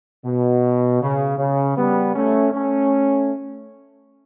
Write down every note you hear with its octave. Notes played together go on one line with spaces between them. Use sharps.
B2
C#3
C#3
G3 B3
A3 C#4
A3 C#4